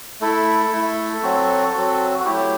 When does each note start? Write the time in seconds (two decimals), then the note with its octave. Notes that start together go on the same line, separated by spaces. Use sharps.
0.21 A3 E4 A4
0.72 A3 E4
1.23 F#3 C4 F#4
1.74 F#3 C4 F#4
2.20 F#4
2.25 F#3 A3 E4 G4